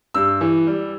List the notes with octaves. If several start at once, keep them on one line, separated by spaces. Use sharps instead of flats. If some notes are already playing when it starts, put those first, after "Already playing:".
G2 E6
E3
G3